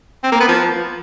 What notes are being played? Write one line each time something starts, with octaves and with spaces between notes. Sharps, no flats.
C4
A#3
B3
F3